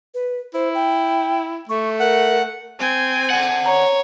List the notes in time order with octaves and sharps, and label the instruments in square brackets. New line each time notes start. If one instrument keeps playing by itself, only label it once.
[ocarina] B4
[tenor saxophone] E4 [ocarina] C5
[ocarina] G5
[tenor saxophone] A3 [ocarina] C#6
[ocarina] A#4 [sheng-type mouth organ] F#5
[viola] C4 G#5
[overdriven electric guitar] D5 F#5
[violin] C#5 [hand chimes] A#5